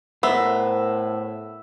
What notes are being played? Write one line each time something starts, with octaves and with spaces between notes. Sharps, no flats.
A2 B3 A#4 C5 E5